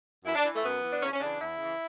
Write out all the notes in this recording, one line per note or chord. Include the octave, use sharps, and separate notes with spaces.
F#2 E4
D4
E3
A3
F#2 B3
E3
D4
E2 C#4
C#4
C#3 E3 D4
E2 E4
C#3 E3